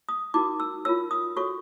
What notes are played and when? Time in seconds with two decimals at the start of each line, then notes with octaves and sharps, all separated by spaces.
0.09 D#6
0.34 D#4 F#4 A#4 D6
0.60 E6
0.85 F4 A#4 C#5 E6
1.11 D#6
1.36 F#4 A4 C#5 C#6